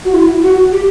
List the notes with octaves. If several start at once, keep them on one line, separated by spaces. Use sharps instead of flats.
F#4
E4
F#4
G4